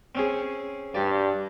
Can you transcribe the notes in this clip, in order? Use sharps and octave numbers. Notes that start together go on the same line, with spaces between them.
C4 C#4 G#4
G2 G4 D5